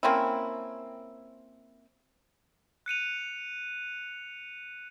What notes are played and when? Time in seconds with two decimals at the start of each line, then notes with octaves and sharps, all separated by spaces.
0.03 A#3 C4 C#4 E4
2.86 F#6 C#7 D#7 F7